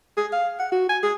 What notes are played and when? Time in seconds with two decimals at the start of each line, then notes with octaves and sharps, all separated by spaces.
0.17 G#4
0.33 F5
0.59 F#5
0.72 F#4
0.89 G#5
1.03 G#4